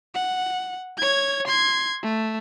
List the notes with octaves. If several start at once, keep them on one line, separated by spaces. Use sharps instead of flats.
F#5
C#5 G#6
C6 G#6
A3